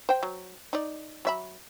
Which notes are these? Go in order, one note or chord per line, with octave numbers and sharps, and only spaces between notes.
C5 G5
F#3
D#4 D5
F#3 E5 B5